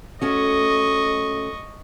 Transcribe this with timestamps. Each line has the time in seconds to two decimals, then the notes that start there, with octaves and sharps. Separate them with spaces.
0.21 A3 C#4 F#4 D#5 C#6